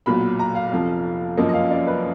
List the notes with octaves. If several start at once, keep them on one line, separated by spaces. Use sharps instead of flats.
B1 A#2 F#3 B5
A#5
F5
F1 F2 F3
F#2 F3 A#3 D#5
D#5
F5
D5
B4